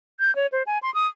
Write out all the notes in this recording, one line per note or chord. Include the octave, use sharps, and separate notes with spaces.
G6
C#5
C5
G#5
C6
D#6